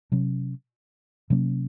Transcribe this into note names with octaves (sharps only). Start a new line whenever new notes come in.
C3 F#3 C#4
C3 F#3 A#3 C#4